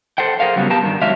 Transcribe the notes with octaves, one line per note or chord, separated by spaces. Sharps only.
A4 C5 F#5 G5
G#4 A#4 C5 F5
C#3 F#3 G3 B3
B3 G4 A#4 A5
G2 D#3
F#3 G#3 D4 E5 F5